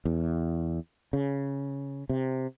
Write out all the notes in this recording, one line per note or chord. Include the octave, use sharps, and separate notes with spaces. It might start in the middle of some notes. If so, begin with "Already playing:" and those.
E2
C#3
C3